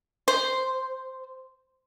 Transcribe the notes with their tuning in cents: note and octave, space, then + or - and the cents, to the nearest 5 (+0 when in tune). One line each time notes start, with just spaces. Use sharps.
C5 -5